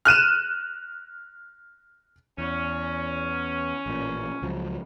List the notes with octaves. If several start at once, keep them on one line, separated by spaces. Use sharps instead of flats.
F6 F#6 D#7 E7
E2 C#4
A1 A#2
C#2 F3 F#3